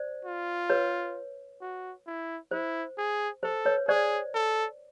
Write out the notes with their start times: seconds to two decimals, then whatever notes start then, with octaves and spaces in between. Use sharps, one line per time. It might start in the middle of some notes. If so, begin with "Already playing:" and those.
Already playing: C5 D5
0.25 F4
0.70 B4 C#5
1.61 F#4
2.07 E4
2.51 E4 C5
2.98 G#4
3.43 A4 C5
3.65 B4 C#5
3.88 G#4 C5 D5
4.34 A4